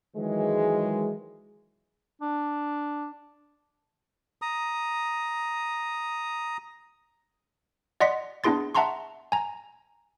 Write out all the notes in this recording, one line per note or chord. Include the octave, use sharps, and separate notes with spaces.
D#3 E3 F#3 G#3
D4
A#5 D#6
D5 D#5 F#5 C6 A#6 B6
B3 D4 E4 G#4 C6 A6
E5 F#5 A5 A#5 C6 C#6
G#5 A#5